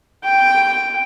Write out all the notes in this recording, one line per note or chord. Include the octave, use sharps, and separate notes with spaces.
G5